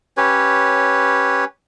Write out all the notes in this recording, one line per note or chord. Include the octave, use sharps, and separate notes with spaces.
C#4 G4 B4 C#5